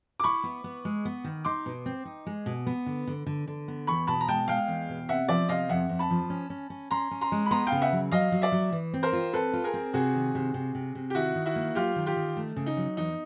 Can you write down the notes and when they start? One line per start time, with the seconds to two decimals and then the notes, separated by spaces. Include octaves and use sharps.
0.20 D6
0.24 E4 B5 C#6
0.44 B3
0.64 B3
0.85 G#3
1.05 B3
1.24 D#3
1.45 D#4 C6 D6
1.66 B2
1.86 C4
2.05 D#4
2.27 G#3
2.46 B2
2.66 B3
2.86 D3
3.07 D3
3.26 D3
3.47 D3
3.68 B3
3.87 E2 B5 C#6
4.07 B2 A5 B5
4.21 A#5
4.27 G#3 G5 A5
4.48 G#3 F5 G5
4.68 E2
4.89 B2
5.09 C3 E5 F#5
5.29 F3 D5 E5
5.49 C3 D#5 F5
5.69 F2 E5 F#5
5.89 F2
5.99 A5 B5
6.10 F3
6.30 C#4
6.50 C#4
6.70 C#4
6.91 C#4 A#5 C6
7.11 C#4
7.21 A#5 C6
7.32 G#3
7.46 B5
7.51 B3 A#5 C6
7.67 F5 G5
7.72 C#3
7.82 E5 F#5
7.92 F#3
8.12 F#3 D#5 F5
8.32 F#3
8.42 D5 E5
8.52 F#3
8.72 E3
8.94 C4
9.03 A#4 C5
9.13 F4
9.33 C4 A4 B4
9.53 F4
9.64 G#4 A#4
9.74 C4
9.93 C3 F#4 G#4
10.14 D#3
10.35 C3
10.54 C3
10.75 C3
10.95 C3
11.10 G4
11.15 D#3 E4 F#4
11.35 D#3
11.46 E4 F#4
11.56 A#3
11.75 F#3 F4 G4
11.96 D#3
12.06 F4 G4
12.16 D#3
12.37 A3
12.56 C#3
12.66 D#4
12.77 F#3
12.97 E2 D#4